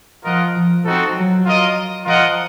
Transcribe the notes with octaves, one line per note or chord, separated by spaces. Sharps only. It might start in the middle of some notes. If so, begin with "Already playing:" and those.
F3 F4 A#4 D#5 F#5
F3
F3 C4 D#4 F#4 A4
F#3
F4 A#4 D#5
F3 F4 A#4 D#5 F#5